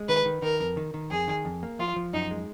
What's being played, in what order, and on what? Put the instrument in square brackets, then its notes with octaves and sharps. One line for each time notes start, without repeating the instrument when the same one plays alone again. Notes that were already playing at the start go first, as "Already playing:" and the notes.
Already playing: [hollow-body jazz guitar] G#3
[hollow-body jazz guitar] D#3 [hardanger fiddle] B4
[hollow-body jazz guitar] D#3
[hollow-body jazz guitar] D#3 [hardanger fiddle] A#4
[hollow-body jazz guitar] F2
D#3
D#3
[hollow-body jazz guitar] F2 [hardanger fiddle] G#4
[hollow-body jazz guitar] D#3
F2
A#3
[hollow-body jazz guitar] F3 [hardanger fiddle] F4
[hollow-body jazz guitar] F3
[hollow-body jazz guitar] F#2 [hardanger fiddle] D#4
[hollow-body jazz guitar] G#3